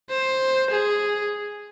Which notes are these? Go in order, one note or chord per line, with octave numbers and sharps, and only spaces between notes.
C5
G#4